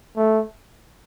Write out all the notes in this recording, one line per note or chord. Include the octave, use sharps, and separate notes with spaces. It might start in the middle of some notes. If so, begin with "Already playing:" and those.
A3